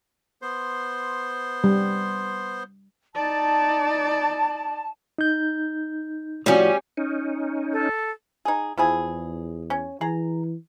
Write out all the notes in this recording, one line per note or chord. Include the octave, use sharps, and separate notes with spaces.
B3 C5 C6
G3
D#4 D5 A5
D#4 G6
A2 F3 G3 C#4 F#4
C#4 D#4
A4
D#4 G#4
E2 F3 E4 G#4
C#4
E3 G#4 A#5